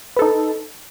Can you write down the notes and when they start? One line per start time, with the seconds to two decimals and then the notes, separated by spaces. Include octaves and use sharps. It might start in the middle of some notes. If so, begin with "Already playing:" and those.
0.16 B4
0.19 A4
0.22 D#4